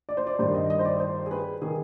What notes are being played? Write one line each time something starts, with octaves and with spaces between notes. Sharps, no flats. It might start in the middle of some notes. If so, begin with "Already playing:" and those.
D5
C5
D5
G2 D#3 C5
D#5
D#5
C5
D5
C5
G#4
B4
D#3 G#4